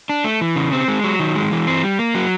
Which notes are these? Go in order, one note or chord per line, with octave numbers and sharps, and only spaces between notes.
D4
A3
E3
C#3
C4
G#3
F#3
D#3
G#3
E3
C4
G3
A#3
F#3